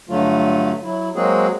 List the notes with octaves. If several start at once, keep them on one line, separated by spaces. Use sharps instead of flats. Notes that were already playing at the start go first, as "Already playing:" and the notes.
G2 D3 F#3 A3 F4
F#3 E4
F#3 G#3 A#3 C4 F#4 G#4